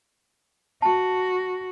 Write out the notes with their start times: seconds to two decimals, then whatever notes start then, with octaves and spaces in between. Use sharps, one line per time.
0.82 F#4 A5